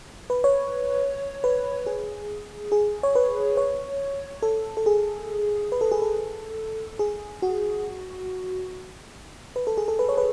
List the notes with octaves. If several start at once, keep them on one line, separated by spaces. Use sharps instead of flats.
B4
C#5
B4
G#4
G#4
C#5
B4
C#5
A4
A4
G#4
B4
A4
G#4
A4
G#4
F#4
B4
A4
G#4
A4
B4
C#5
B4